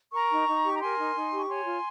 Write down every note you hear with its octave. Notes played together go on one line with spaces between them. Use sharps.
A#4 A#5 C#6
D#4
D#4
G4
A#5
A#4 G#5 C6
D#4
D#4
G4 C#6
C#5 G#5 C6
F4